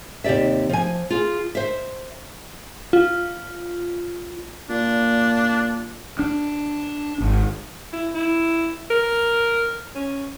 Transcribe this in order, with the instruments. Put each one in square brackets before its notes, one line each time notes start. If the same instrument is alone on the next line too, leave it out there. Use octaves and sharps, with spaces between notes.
[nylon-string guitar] D#2 C3 G4 D5 E5
F3 G#5
F4 G#4
C5 E5
[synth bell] F4
[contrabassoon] A#2 [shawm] D4
[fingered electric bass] D4
G#1
[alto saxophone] E4
E4
A#4
C#4